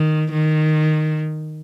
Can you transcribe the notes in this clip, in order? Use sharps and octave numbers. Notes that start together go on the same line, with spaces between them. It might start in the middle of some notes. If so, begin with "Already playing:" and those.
Already playing: D#3
D#3